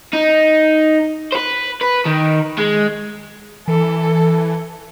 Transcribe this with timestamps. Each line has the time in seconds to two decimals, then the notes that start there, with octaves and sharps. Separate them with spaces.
0.13 D#4
1.32 B4 C5
1.81 B4
2.05 D#3
2.58 G#3
3.68 E3 A4